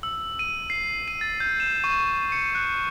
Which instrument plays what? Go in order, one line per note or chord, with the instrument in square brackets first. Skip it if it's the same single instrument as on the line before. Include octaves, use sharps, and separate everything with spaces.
[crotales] E6
D#7
C7
D#7
A6
G6
E7
C#6
C#7
F#6